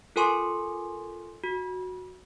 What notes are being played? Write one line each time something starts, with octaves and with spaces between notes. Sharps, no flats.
F4 A4 A#4 G#5 C6 C#6
F#4